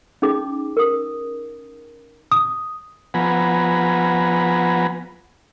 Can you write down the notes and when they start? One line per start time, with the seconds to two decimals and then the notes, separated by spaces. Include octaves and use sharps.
0.22 C#4 D#4 G#4 D6
0.77 A#4 D#6
2.32 D#6
3.14 F3 B3 F#5 G#5 A#5 B5